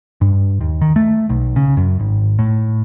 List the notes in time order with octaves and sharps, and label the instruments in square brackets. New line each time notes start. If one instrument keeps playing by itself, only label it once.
[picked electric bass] G2
D#2
D#3
A3
B1
C#3
F#2
G#1
A2